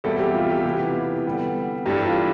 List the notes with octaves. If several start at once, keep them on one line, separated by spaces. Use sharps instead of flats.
E2 B2 G3 C4 E4 A4
G4
F4
G4
C3 E3 B3
D3 G3 B3
G2 E3 G3 D4 G4 A4
F4